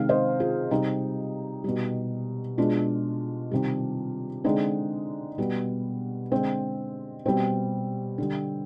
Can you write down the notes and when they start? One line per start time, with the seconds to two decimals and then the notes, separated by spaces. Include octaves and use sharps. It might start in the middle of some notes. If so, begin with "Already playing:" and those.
Already playing: C3 D#3 G#3 F5
0.09 C5 D#5
0.40 F4 G#4
0.71 C3 G3 D#4 G4
1.64 B2 G3
2.58 B2 G#3 D4 F4
3.51 C3 D#3 G3
4.44 D3 G#3 C4 D#4
5.38 B2 G3 B3
6.32 D3 G#3 C4
7.25 B2 G3 C4
8.18 D3 G3